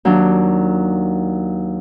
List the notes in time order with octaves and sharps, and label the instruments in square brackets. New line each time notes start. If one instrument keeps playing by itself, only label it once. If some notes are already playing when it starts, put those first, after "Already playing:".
[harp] D#2 F#3 D4